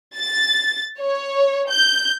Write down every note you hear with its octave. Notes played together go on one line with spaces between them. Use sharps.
A6
C#5
G6